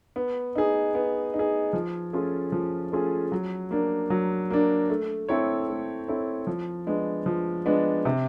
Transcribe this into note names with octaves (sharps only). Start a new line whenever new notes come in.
B3
D#4 G#4
B3
D#4
G#4
F3
A3 C#4 F4 G#4
F3
A3 C#4 F4 G#4
F#3
A#3 D4
F#3
A#3 D4
A3
C4 E4 A4 C#5
A3
C4 E4 A4 C#5
F3
G#3 B3 D4
F3
G#3 B3 D4
C3